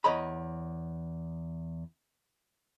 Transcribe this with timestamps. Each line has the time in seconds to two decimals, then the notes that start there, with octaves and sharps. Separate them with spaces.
0.04 E2 C#5 D#5 A#5 B5